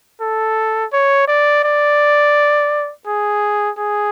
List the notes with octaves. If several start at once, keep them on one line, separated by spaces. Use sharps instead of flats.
A4
C#5
D5
D5
G#4
G#4